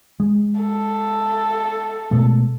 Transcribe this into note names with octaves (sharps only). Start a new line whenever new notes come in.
G#3
A4
B2 G#3 A3